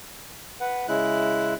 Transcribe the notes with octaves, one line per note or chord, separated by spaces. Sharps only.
B4 F#5
C#3 G#3 E4 F#6